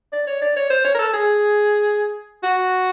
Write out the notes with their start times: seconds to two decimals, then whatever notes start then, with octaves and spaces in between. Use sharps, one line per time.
0.13 D5
0.27 C#5
0.42 D5
0.56 C#5
0.70 C5
0.84 C#5
0.94 A#4
0.99 A4
1.13 G#4
2.43 F#4